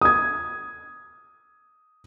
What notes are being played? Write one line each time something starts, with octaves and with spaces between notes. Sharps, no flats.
D#6 G#6